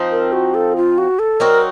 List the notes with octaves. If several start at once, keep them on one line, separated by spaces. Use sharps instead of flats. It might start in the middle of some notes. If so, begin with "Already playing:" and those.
Already playing: F3 C4 D#4
A#4
F#4
A4
F4
F#4
A4
F#3 C4 D#4 F#4 A#4